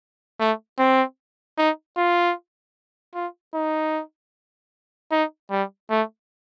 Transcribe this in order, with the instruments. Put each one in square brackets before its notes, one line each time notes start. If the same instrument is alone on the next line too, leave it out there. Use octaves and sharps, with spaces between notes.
[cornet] A3
C4
D#4
F4
F4
D#4
D#4
G3
A3